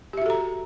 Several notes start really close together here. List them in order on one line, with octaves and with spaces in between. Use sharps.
G4 E5 F#4 A4 A#5